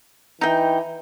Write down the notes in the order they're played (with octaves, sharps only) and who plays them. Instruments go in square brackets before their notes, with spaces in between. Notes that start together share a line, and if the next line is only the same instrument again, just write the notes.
[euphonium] E3 [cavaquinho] D#4 G5